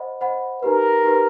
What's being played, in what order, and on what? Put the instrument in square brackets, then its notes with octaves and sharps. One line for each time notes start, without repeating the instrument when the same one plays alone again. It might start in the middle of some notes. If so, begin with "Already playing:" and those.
Already playing: [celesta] C5 D#5 F#5 B5
C5 D#5 F#5 B5
[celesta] D#4 G4 B4 [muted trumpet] A#4
[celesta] D#4 G4 B4